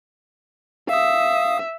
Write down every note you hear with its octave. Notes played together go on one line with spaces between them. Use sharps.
E5 F5 D#6